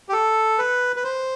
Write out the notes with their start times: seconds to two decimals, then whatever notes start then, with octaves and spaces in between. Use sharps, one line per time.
0.09 G4
0.13 A4
0.58 B4
0.96 B4
1.04 C5